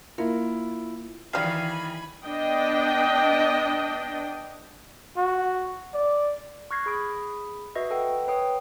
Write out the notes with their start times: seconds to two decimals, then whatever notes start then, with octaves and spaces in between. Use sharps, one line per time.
0.18 A#3 E4 F4 A#4 F5
1.33 D#3 E3 F#3 G3 F4 F5 G#5 B5
2.25 B3 D4 D#5 G5
5.17 F#4
5.94 D5
6.71 C#6 F6 F#6 G#6 A#6 C7
6.86 G#4 B5 D#6 D7
7.75 F#4 B4 D#5 E5
7.90 A4 B4 F#5 G5
8.28 B4 C#5 G5 D#6